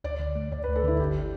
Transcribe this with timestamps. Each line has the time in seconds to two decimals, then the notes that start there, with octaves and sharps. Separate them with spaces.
0.04 D2 D5
0.20 D3
0.35 A3
0.52 D2 D5
0.64 B4
0.68 D2
0.76 A4
0.83 D3 E4
0.99 G1 G4